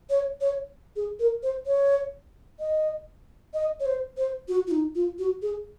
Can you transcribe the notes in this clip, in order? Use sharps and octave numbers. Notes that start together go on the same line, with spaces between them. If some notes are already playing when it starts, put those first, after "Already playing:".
C#5
C#5
G#4
A#4
C5
C#5
D#5
D#5
C#5
C5
C5
F#4
F4
D#4
F4
F#4
G#4